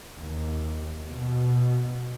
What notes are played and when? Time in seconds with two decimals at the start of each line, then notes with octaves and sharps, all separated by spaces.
0.16 D#2
1.08 B2